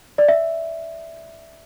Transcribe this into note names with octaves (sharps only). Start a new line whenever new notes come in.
D5
E5